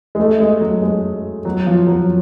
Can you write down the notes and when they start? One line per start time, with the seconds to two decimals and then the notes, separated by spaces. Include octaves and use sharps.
0.15 G#3
0.20 A3
0.40 G#3
0.61 F#3
0.82 G#3
1.45 F#3
1.66 F3
1.87 F#3